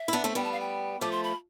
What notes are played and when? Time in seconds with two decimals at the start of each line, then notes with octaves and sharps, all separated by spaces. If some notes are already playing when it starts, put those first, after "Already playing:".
Already playing: E5
0.08 E4
0.13 B3 D4
0.24 A3 C4
0.35 G3 B3 G5
0.44 A5
0.52 F5
0.60 G5
1.01 F3 A3 D6
1.11 C6
1.23 B5